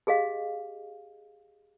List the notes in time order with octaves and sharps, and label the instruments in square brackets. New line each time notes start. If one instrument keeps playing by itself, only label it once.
[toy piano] G4 G#4 D#5 F5